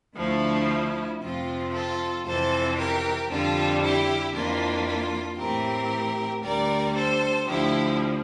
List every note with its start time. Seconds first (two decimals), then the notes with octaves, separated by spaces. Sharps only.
0.16 D2 D3 F3 A3 E4
1.21 F2 C3 F3 C4 F4
1.72 F4 A4
2.25 F2 C3 E3 A4 C5
2.78 G4 A#4
3.30 F2 D3 G3 F4 A4
3.82 E4 G4
4.34 F2 E3 A#3 D4 F4
4.86 F4
5.38 A2 E3 A3 C4 G4 A#4
6.43 D2 D3 G3 A#4 D5
6.95 A4 C5
7.47 D2 D3 F3 E4 G4